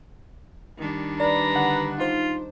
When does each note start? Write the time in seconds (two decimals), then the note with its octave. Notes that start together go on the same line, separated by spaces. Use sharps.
0.78 D#3 G3 D4
1.20 B4 D5 A#5
1.55 D3 F#5 F#6
1.98 D#4 F4 C5